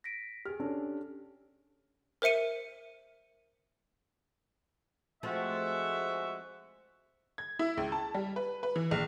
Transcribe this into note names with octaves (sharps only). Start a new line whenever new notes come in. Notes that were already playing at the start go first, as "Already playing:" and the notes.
A#6 B6 D7
G4 G#4 F6
C#4 D4 A4
A#4 C5 E5 C#7 D#7
F3 G#3 A3 C4 F#4 E5
G#6
E4
C#2
A5
G3
B4
B4
E3
A#1